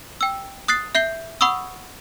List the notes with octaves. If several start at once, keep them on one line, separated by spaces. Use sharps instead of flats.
G5 E6
D#6 F#6 A6 C7
E5 G6 C7 G7
F#5 B5 C#6 D#6 E6